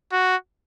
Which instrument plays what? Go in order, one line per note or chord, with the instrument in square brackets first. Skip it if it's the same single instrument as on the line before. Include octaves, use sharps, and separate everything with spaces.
[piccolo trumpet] F#4